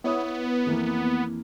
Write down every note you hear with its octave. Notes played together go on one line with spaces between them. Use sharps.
B3 E4 C#5 D#6
F2 E3 A#3